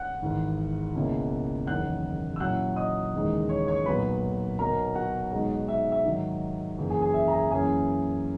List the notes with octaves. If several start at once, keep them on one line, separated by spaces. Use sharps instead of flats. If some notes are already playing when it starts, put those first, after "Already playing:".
Already playing: F#5 F#6
G#1 G#2 E3
C#2 B2 A#3 C#4 E4
F#1 E2 D#3 F#5 F#6
E6
A#2 F#3 C#4 E4 F#5 F#6
D#5 D#6
D#2 C#3 E3 G#3 D#4
C#5 C#6
C#5 C#6
B1 A#2 F#3 B3 B4 B5
B1 B2 F#3 B3 A#4 A#5
F#4 F#5
B1 B2 G#3 D#4
E5
E5
G#2 D#3 F#3
F#2 C#3 E3 A#3
G#4 G#5
G#4 G#5
E5
A#5
G#4 G#5
F#2 E3 A#3 C#4 E4 G#4 G#5